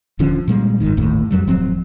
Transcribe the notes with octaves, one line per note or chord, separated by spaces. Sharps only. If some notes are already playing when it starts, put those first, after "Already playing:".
D#1 D3 F3 C#4
A#2 G3 G#3
G1 G#2 D#3
G1 D#2 A2
F2 F#3 G3
D1 F3 F#3 C4